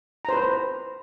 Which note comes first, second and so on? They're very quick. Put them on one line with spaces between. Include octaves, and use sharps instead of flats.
A#5 C5 B4